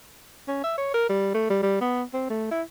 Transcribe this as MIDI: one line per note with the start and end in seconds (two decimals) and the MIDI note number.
0.48 0.59 61
0.64 0.76 76
0.78 0.91 73
0.94 1.05 70
1.09 1.32 55
1.34 1.46 57
1.50 1.60 55
1.63 1.80 55
1.81 2.03 59
2.14 2.29 60
2.30 2.49 57
2.51 2.63 64